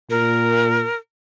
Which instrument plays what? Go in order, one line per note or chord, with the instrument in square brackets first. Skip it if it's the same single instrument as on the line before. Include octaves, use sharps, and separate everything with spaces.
[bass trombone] A#2 [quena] A#4